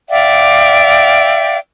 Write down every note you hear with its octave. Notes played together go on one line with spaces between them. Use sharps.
D5 E5 F5 G5